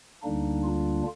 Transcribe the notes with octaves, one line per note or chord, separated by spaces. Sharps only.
D2 D3 G3 A#3 D4 D#4
F4